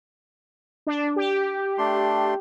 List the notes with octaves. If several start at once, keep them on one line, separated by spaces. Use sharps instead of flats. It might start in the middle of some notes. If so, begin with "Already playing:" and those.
D4
G4
A3 D4 C6